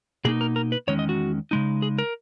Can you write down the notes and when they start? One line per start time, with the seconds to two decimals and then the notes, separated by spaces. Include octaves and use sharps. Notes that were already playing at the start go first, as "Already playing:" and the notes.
0.25 B2 A#3 D#4 G#4
0.41 A#4
0.56 A#4
0.72 B4
0.87 E2 D#3 G#3 C#4 C#5
0.99 D#5
1.09 F#4
1.51 C#3 G#3 D#4
1.82 G#4
1.98 A#4